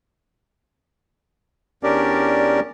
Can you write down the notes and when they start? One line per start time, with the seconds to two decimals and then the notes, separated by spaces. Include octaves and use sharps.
1.83 E2 C#4 D4 G4 A#4 D5